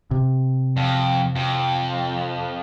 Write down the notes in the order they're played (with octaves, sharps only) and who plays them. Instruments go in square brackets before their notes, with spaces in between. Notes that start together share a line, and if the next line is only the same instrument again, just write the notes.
[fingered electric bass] C3
[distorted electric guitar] F2
F2